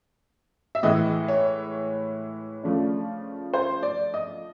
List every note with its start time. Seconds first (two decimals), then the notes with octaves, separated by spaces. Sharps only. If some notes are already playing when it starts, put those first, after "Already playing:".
0.75 E5
0.83 A2 E3 G#3 D#5
1.28 C#5
2.63 C#3 F3 A3 D4
3.54 C5
3.83 D5
4.14 D#5